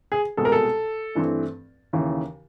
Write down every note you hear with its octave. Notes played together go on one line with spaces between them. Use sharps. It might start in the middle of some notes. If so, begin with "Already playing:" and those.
G#4
C2 B2 G#3 A4
A#4
A4
G2 E3 A3 C4
D#2 C#3 E3